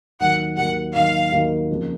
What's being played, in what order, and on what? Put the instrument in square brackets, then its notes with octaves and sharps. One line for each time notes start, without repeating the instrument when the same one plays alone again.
[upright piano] D#2 D#3 F#3 A#3 [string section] F#5
[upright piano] D#2 D#3 F#3 A#3 [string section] F#5
[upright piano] D#2 D#3 F#3 A#3 [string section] F5
[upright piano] D#2 D#3 F#3 A#3
F2 C#3 F3 A#3